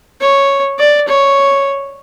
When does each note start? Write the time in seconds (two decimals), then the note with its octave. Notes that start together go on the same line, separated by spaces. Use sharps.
0.21 C#5
0.79 D5
1.08 C#5